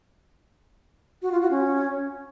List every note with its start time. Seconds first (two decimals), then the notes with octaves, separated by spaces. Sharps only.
1.22 F#4
1.32 F4
1.41 F#4
1.51 C#4